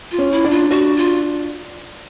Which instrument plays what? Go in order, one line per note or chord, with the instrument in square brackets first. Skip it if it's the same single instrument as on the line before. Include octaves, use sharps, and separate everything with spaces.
[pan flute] F4
[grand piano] C#4
[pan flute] E4
[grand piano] D4
[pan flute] F4
[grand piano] D4 [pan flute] F#4
[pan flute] F4